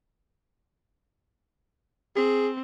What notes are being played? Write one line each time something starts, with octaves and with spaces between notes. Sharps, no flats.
C4 G#4